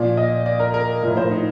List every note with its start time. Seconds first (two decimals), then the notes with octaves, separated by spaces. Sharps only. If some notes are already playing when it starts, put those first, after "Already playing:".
Already playing: A#2 F3 D5
0.17 D#5
0.46 D5
0.60 A#4
0.74 A#4
1.03 A2 F3 A#4
1.17 C5
1.31 D#4